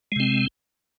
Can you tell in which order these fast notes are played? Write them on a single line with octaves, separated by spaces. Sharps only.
G#3 C3 C4